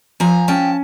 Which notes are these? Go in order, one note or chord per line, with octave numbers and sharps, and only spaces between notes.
F3 G#5 A#5
C#4 G5 A5